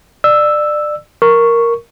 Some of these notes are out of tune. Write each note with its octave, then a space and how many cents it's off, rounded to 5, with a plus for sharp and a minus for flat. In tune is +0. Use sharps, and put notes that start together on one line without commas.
D5 +25 E6 +0
A#4 +0 C#6 +0